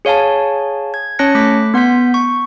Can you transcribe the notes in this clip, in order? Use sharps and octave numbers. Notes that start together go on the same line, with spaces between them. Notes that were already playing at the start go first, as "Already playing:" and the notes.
G#4 C#5 F5 G#5 A5
G#6
C#4 C#5 A5 F#6 A#6 C#7
A3 D6 F#6 B6
B3 F#5 C6 G6 B6
C#6